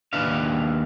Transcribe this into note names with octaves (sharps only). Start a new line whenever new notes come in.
D#2 D4 B4 E5 F5